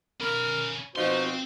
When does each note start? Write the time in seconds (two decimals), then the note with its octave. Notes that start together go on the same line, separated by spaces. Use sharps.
0.20 C#4 A#4 B5
0.96 B2 F3 C4 D#4 F#4 C5 C6